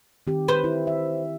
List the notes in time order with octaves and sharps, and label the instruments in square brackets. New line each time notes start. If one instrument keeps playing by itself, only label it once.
[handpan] D#3 C4 G4
[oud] B4 C5
[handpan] E4
E5